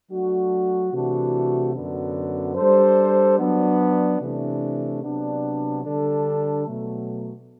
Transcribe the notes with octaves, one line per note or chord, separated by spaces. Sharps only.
F#3 A3 D4 F#4
C3 E3 A3 D4 F#4
F#2 D3 F#3 B3
G3 D4 A4 C5
F#3 B3 D4
C3 E3 A3 D4
C3 F#3 B3 D4
D3 G3 D4 A4
B2 F#3 A3